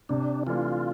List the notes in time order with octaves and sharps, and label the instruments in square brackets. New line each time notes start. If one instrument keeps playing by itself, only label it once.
[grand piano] C3 [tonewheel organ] D4
[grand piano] E3 A3 D4 [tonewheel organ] F4